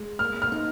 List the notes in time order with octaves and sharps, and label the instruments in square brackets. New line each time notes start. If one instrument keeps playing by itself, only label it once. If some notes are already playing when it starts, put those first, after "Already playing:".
Already playing: [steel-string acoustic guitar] G#3
[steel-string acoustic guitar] A#3 [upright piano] F6
[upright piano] F6
[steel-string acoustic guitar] D#4